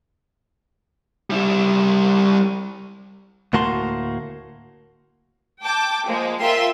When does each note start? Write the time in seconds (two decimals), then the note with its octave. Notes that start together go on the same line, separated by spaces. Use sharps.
1.30 G3 E4
3.53 D2 A2 A#3 F#4 A5 C6
5.64 G5 A5 D6
6.06 F3 G#3 A#3
6.39 F4 A#4 E5 G5 C6